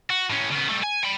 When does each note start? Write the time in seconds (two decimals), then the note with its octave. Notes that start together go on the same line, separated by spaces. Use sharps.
0.10 F#4
0.30 A2 C#4
0.52 C#3 B3
0.69 G3 A3
0.84 G#5
1.04 G5 B5